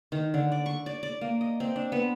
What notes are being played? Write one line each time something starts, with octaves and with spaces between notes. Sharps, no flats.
D#3
D3
D5
C#6
D5
D5
A#3
D#5
C4
D4
B3